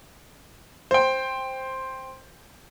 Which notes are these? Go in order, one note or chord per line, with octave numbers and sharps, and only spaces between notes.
C5 G5